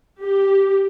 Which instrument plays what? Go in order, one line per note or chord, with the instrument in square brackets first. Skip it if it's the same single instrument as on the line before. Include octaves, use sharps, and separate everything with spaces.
[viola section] G4